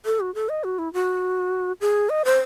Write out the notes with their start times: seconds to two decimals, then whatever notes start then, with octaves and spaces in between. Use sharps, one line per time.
0.05 A4
0.20 F#4
0.35 A4
0.49 D#5
0.64 F#4
0.79 E4
0.93 F#4
1.81 G#4
2.10 D#5
2.25 C5